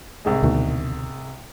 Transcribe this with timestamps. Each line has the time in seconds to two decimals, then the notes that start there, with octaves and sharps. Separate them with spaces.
0.25 C2 G#2 G#3
0.43 D2 B2 D#3